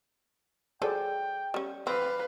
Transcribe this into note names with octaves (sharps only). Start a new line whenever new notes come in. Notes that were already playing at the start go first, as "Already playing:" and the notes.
F#3 G#4 A4 C5 D5 G5
G3 C#4
C4 B4 D5 F5 G5 B5